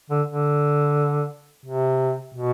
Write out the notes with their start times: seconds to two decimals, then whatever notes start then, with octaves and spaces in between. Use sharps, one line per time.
0.10 D3
0.27 D3
1.65 C3
2.34 B2